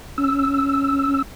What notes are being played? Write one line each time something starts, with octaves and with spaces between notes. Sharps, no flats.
C#4 E6